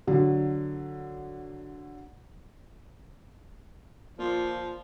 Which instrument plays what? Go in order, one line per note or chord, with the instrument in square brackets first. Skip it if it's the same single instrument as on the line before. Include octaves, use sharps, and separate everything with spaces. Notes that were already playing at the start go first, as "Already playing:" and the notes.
[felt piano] D3 F#3
[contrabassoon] A#2 [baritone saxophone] F3